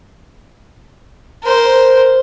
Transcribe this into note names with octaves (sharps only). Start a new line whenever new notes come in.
A#4 C5